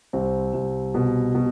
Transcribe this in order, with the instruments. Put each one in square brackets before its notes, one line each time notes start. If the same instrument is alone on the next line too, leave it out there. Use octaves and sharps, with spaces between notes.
[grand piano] C2 C4
C2
B2
B2